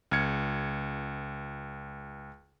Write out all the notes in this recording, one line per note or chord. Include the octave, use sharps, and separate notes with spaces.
C#2 F6 G#6 C#7